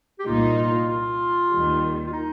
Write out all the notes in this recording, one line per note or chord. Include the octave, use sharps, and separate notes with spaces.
G4
C2 A#2 A#3 D#4 F4
F4
F4
D#2 D#3 G3
F4
D#4